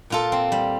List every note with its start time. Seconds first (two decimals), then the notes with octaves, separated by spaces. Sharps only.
0.10 A#2 F4 A4
0.32 C4
0.52 G3